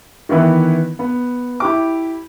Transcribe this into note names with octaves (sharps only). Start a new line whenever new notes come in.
D#3 E3 B3 E4 B4
B3
E4 G4 D6